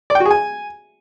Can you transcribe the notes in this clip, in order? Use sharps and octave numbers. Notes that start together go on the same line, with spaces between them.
D5
G5
F#4
G#4
G#5